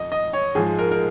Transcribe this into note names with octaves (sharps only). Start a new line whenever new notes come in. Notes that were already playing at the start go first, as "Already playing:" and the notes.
Already playing: F2 D#5
D#5
C#5
G#2 F3 G#3 G#4
A#4
A#4